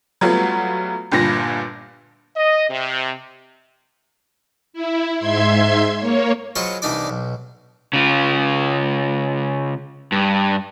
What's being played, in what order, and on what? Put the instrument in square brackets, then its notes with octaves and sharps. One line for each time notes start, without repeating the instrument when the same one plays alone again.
[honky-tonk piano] F#3 G3 A3 B3 F4 F#4
G1 G2 A#2 D3 F4 A#6
[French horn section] D#5
C3
[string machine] E4
G#2 E5 C6 G#6
A#3 C#5
[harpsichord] F#3 G#3 F4 B4 C5 C#6
C2 E3 D4 D#4 D5 D6
B1
[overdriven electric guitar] C#3 F4
G2